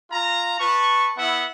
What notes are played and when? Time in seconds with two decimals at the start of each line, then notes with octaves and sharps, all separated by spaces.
0.10 F4 A#5
0.59 B4 A5 C#6
1.17 B3 E4 E5 F#5